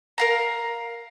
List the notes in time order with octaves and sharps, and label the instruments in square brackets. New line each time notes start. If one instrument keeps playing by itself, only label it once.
[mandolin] A#4 F5 A#5